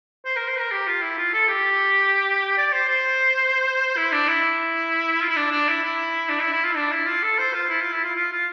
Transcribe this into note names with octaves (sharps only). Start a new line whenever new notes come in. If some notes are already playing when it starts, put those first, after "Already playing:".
C5
A#4
C5
A#4
G4
F4
E4
F4
A4
G4
D5
C5
C5
E4
D4
E4
F4
E4
D4
D4
E4
E4
D4
E4
E4
F4
D4
E4
F4
A4
C5
F4
E4
F4
E4
F4
F4
F4